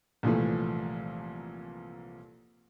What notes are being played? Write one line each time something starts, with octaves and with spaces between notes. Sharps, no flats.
C2 A#2 E3 F3 A3